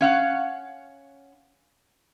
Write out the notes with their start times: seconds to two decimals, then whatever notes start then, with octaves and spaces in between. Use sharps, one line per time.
0.01 C#4 F5 F#5